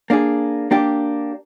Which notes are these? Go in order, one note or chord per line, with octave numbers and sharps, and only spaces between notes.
A#3 D4 G#4
A#3 D4 G4